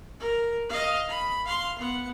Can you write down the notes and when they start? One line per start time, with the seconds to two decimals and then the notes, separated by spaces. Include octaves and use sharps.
0.20 A#4
0.69 D#5 F5
1.09 B5
1.45 F5 C6
1.78 B3 F#5